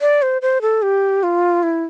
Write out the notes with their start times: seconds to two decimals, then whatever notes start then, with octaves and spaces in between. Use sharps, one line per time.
0.01 D5
0.22 C5
0.42 C5
0.62 A4
0.82 G4
1.23 F4
1.63 E4